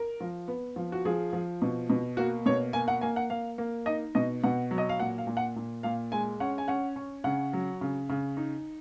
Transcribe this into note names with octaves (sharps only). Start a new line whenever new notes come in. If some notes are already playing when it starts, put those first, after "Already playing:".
Already playing: A#4
F3
B3
F3
F#4
F3 G#4
F3
B2
B2
A#3 F#4
B2 C#5
A#3 G#5
F#5
A#3 G#5
F#5
A#3 F5
A#3
D#4 D#5
B2 D#5
B2 F#5
F#3
D#5
F5
A#2 F#5
F5
A#2
F#5
A#2
A#2 F5
G#3 G#5
C#4 F#5
G#5
C#4 F#5
C#4
C#3 F#5
F#3
C#3
C#3
D#4